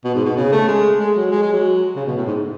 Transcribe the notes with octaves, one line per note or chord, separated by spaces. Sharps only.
B2
G#2
B2
C#3
A3
G#3
G#3
F#3
G#3
G#3
F#3
C#3
B2
A2
G#2